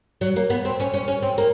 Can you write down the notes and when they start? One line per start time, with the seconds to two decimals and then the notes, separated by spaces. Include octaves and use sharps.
0.21 F#3
0.36 A#3
0.50 B3
0.65 C4
0.80 C#4
0.94 C#4
1.08 C#4
1.22 C4
1.38 A#3